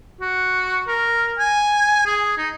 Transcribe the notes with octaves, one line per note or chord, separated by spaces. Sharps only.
F#4
A#4
G#5
G#4
D#4